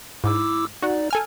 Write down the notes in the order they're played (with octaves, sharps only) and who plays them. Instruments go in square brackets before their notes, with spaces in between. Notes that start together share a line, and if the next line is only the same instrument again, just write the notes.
[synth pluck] G#2 [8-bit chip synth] E4 D6 E6
[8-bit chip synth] D#4 D5 [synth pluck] F#4 F#5
[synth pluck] A4 G#5 F6